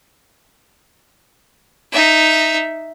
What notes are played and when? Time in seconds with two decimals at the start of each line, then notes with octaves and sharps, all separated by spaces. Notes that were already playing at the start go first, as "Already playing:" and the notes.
1.92 D#4 E5